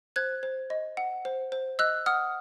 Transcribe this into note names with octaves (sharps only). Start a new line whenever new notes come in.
C5 F#6 G#6
C5
D#5
F#5
C5
C5
D#5 E6 F#6
F#5 D#6 F6